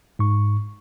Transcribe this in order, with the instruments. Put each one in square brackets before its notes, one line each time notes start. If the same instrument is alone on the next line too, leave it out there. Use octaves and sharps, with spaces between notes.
[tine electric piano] G#2 C#6